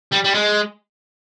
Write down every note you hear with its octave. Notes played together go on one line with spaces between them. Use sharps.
G3
G3
G#3